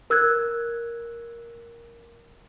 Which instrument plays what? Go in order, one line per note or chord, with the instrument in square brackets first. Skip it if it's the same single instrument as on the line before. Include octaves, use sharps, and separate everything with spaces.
[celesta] A#4 E6 F#6 G#6